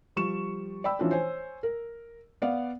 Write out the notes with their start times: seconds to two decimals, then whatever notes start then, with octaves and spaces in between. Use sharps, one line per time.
0.16 F3 G3 C#6 E7
0.84 D5 G5 B5 E6
0.99 E3 F3 C#4 D4 F4 F#4
1.11 C5 C#5 G#5
1.63 A#4
2.42 B3 D5 F5 F#5